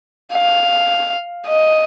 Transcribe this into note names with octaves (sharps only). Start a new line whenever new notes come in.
F5
D#5